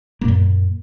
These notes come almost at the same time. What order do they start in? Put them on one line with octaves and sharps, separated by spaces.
A#3 A#2 F#2